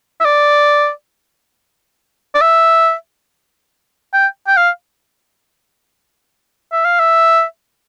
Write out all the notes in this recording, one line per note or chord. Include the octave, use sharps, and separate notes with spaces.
E5
D5
D5
E5
G5
G5
F5
E5
F5
E5